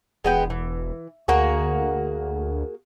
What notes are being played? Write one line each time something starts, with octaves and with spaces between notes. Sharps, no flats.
E1 G#3 B3 G5
E3
D2 A#3 F#4 G#4